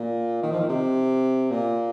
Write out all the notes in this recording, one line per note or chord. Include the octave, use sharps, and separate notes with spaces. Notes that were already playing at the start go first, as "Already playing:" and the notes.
Already playing: A#2
D#3
F3
D#3
C3
A#2